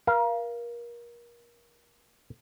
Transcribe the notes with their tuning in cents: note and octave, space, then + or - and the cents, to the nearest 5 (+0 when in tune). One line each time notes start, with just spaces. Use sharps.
A#4 +30 F5 -15